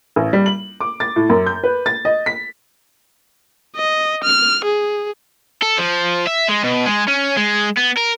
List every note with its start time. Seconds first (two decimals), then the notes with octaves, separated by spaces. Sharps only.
0.16 A1
0.33 G3
0.46 F#7
0.80 D6
1.00 A6
1.16 A2
1.30 F#2
1.46 G6
1.63 B4
1.86 A6
2.05 D#5
2.26 B6
3.76 D#5
4.24 F6
4.64 G#4
5.62 A4
5.78 F3
6.27 E5
6.48 G#3
6.63 B2
6.86 G#3
7.08 C#4
7.37 G#3
7.77 B3
7.97 A#4